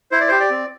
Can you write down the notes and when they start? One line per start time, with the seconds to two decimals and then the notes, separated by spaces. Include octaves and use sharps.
0.12 E4 C5
0.20 D5
0.28 G4 C5
0.40 D5
0.50 C4